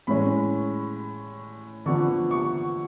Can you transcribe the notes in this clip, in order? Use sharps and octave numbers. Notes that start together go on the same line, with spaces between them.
A2 G#3 C#4 B5
D3 F3 B3 C#6
C#6